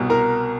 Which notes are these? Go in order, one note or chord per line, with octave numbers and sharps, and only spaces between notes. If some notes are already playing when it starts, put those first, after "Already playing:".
Already playing: C2 B2
A#4 A#5